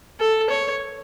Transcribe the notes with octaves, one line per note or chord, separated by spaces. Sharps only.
A4
C#5